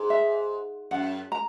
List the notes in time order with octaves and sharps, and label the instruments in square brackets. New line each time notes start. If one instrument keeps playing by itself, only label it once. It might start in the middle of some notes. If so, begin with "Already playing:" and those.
Already playing: [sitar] G#2
[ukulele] E5
[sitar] F#2 [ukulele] F#5
[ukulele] A#5